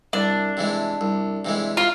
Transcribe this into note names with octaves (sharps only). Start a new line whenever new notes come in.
C2 D4
C3 E3 G#3
C2
C3 E3 G#3
F4